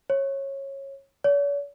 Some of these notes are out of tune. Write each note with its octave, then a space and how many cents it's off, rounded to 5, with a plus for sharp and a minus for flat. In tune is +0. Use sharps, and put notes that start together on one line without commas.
C#5 -20
C#5 +45